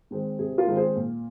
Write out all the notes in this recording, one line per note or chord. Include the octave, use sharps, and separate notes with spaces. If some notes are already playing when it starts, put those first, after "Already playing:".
D#3 G#3 C4
C3 G#4
F4 A#4
D#3 G#3 C4
G#4 C5
A#2